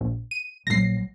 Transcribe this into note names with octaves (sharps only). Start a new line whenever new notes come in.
A#1
D#7
A#1 F#3 A#6 C7